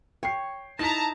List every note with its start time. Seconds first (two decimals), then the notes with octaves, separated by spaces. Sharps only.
0.23 C#5 G5 C7
0.79 D#4 E4 A#4 A5 A#5 A#6 B6